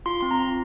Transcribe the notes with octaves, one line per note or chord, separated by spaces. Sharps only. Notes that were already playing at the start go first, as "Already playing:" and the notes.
F4 C6
C4 C6
A#5
C4